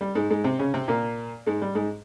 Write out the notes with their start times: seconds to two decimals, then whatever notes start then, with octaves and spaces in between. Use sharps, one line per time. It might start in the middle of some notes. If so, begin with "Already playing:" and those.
0.01 G3
0.15 G#2 G#3
0.30 G#2 G#3
0.44 C3 C4
0.59 C#3 C#4
0.74 C3 C4
0.88 A#2 A#3
1.47 G#2 G#3
1.62 G3
1.75 G#2 G#3